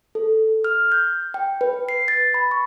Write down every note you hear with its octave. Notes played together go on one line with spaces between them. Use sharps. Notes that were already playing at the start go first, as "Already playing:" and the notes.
A4
F6
G6
G5
B4
C7
A6
B5
C#6